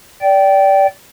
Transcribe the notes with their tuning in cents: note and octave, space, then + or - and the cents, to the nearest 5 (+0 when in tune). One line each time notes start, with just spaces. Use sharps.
D5 -20 G5 -15